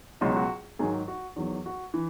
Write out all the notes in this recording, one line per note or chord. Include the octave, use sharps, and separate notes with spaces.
C#2 B2 F#3 D#4
F#4
G#2 D#3 F#3 G#4
F#4
E2 D#3 F#3
F#4
E3